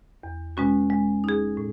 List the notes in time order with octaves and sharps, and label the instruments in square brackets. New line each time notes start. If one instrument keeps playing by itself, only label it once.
[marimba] E2
B2 G#3 C#4 F#4
G#3
D#4 G#4
A2